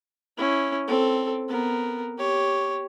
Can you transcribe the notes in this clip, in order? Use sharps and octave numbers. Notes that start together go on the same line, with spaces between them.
C#4 E4
C4 A4
B3 A#4
G4 C#5